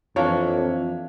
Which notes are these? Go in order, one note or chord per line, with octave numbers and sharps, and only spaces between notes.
F2 E3 A#3 D4 C#5